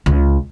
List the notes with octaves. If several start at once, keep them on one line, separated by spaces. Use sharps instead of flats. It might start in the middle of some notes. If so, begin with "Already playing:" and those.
C#2